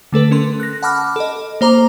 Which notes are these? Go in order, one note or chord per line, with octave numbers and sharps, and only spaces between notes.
D3 A3 A4 B4
C#4 A#4 C6
F#6 A#6
F#5 A5 B5 D6 F6
A4 D#5
A#3 C5 A#5 D6 F7